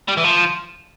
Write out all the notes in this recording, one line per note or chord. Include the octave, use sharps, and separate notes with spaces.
G3
E3
F3